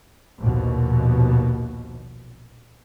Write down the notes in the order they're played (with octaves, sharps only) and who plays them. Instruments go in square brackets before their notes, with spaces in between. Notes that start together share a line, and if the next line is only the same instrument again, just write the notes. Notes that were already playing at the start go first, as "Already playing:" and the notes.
[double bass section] A#1 D#2 B2